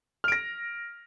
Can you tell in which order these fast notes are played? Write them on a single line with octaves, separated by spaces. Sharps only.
F6 D7 A#6